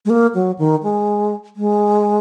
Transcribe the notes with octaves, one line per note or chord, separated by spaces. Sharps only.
G#3
A#3
F#3
D#3
G#3
G#3